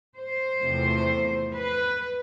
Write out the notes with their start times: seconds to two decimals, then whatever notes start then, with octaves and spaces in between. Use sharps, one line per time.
0.18 C5
0.63 E2 C3 F3 A3
1.54 B4